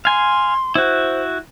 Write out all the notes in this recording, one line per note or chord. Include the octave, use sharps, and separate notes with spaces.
F5 G#5 C6
E4 F#4 C5